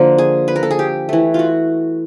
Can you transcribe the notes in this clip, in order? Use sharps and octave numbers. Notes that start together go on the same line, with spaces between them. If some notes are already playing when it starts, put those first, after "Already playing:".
Already playing: D3 F3 A#3
G#4
B4
A#4
A4
G#4
G4
E3 A3
F4 F#4